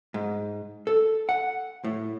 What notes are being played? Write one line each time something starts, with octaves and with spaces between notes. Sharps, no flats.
G#2
A4
F#5
A2